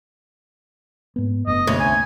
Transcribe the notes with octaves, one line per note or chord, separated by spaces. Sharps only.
G#2 B3
F#1 A3 B3 D#5
D2 C#4
C2 G#5